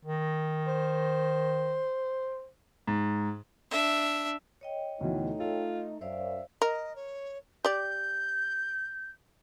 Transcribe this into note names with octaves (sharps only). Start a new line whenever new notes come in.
D#3
C5
G#2
D4 E5
C#5 D#5 G5
D2 B2 E3 A3 D#4
F4 A4
F#2 C5 D5 E5 F5
A#4 D#5
C#5
G4 D5 G6